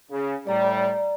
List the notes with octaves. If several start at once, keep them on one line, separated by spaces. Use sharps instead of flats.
C#3
A2 G3 D5 A#5